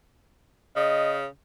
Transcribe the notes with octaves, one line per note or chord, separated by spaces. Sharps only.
C#3 D#5